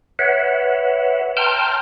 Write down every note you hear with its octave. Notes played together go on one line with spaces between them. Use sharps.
B4 C#5 E5 F#5
G5 A5 A#5 C6 F6 G6